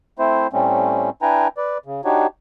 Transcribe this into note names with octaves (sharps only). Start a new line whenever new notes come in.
A3 C4 E4 C5
A2 G3 A3 C4 C#4
D4 E4 B4 G5 G#5 A#5
B4 D5
C#3
D4 D#4 F#4 G4 C#5